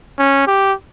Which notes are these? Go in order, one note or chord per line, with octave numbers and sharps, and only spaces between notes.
C#4
G4